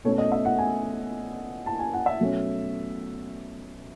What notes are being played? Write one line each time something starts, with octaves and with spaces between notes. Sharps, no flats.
B2 A3 C#4 C#5
D#5
E5
F#5
G#5
A5
G#5
F#5
E5
B2 F#3 A3 C#4